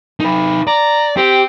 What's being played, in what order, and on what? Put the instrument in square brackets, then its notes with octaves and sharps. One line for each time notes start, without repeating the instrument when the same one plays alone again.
[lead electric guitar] D#4 B4
[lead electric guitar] D5 [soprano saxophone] A#5
[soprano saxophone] C4 [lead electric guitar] G4